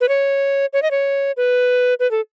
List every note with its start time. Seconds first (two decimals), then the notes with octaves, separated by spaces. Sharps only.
0.01 B4
0.09 C#5
0.73 C#5
0.82 D#5
0.91 C#5
1.37 B4
2.00 B4
2.11 A4